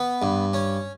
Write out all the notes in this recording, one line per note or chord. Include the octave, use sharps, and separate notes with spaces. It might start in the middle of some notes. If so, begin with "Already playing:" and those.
Already playing: B3
G2
C#4